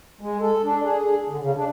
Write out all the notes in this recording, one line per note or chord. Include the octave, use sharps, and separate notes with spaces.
G#3
A4
D4
G#4
D3
C#3
D4